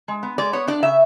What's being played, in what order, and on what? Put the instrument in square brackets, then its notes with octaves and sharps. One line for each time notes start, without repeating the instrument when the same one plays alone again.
[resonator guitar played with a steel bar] G#3
B3
G#3 D5
B3 C#5
D4 D5
C#3 E5